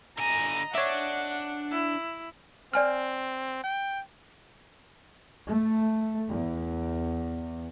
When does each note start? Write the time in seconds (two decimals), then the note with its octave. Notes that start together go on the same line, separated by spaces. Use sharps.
0.19 D3 D#5 G#5 A#5
0.75 D4 C#5 E5 F#5
1.71 E4
2.74 C4 D5 G#5 F6
3.64 G5
5.46 A3
6.29 E2